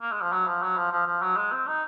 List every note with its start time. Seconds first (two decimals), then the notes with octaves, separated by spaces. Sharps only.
0.02 A#3
0.12 G#3
0.22 F3
0.32 F#3
0.47 F3
0.63 F#3
0.77 F3
0.92 F3
1.06 F3
1.22 F#3
1.36 G#3
1.52 C4
1.67 D#4